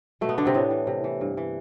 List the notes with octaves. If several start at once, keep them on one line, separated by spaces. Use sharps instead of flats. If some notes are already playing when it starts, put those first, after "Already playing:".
B2 A3
B3
D3 A3 D4
C3 C4
A2 B3
E3
C3
E3
G2
E3